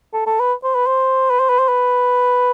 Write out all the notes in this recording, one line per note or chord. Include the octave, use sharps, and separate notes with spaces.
A4
A4
B4
C5
B4
C5
B4
C5
B4
C5
B4